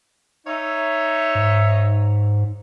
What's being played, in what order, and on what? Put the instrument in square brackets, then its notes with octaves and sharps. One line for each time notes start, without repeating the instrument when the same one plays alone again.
[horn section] D#4 C#5 E5
[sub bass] G#2